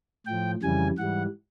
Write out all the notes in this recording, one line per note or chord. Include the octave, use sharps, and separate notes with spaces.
A2 F3 G5
F2 C#3 E3 G3 G#5
G#2 E3 G3 F#5